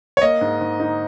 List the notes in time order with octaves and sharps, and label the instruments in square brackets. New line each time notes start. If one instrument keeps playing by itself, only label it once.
[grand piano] C#5
[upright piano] A#3 [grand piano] D#5
[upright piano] G#2
G#2
D#4